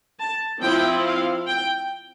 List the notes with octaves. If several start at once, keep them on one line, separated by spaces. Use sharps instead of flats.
A5
F3 C4 E4 G5
F5
G5